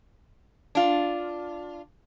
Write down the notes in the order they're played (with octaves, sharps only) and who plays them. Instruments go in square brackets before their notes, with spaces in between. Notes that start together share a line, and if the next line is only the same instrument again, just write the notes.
[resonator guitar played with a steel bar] D4 F4